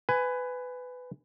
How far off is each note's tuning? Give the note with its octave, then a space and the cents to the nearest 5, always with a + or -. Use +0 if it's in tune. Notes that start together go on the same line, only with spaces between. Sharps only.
B4 +20 G#5 +0